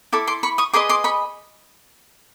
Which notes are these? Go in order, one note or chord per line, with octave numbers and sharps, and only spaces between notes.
E4 A4 D6
C6 D6
B5 C#6
C#6 D#6
G#4 B4 D#5 C6 D6
C6 D6
B5 C#6